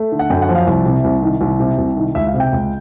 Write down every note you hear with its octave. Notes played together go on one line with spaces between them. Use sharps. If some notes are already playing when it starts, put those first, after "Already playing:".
Already playing: A3
D3
F#5
F#2 G5
F#5
F3
F5
C2
C3
C2
D#3
C2
C3
C2
D#3
C#2 E5
F5
C3
G5
C#2